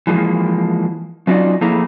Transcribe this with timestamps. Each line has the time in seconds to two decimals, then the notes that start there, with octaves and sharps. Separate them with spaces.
0.07 E3 F3 G#3 A#3
1.27 F#3 C#4 D#4 F4 D5
1.61 F3 A3 A#3 E4 G#4 A#5